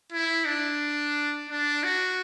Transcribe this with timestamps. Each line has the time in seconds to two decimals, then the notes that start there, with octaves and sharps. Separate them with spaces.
0.12 E4
0.45 D4
1.50 D4
1.84 F#4